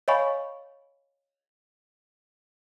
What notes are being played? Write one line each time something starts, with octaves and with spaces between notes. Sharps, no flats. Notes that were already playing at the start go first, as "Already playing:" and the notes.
C#5 D#5 F5 G#5 B5 C#6